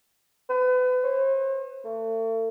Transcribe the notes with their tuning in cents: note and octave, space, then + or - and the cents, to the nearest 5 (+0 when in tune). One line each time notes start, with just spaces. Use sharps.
B4 +35
C5 +45
A3 +40